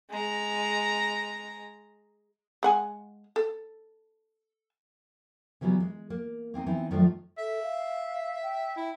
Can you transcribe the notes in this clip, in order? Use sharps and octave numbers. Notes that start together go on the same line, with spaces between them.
G#3 A#5
G#3 F#5 G#5
A4
C#3 E3 F#3 G3 B3
G#3
A#3
A#3 C4 D4 D#4
E3 B3 C4 D#4 E4
F#2 D#3 F3 A3 D4 A4
A4 E5
F5
G5
E4